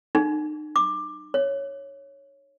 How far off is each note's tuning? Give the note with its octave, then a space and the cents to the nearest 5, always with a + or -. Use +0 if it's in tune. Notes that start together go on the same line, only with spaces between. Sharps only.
D#4 -35
D6 +15
C#5 +0